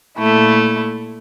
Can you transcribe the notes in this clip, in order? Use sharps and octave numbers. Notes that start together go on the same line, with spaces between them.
A#2 A3 E4